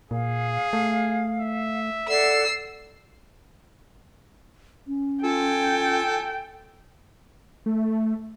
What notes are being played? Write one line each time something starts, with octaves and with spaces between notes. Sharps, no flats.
A#2 G#4 F5
A3
E5
A4 D5 F#5 E6 C7
C#4
F4 A4 G5 G#5
A3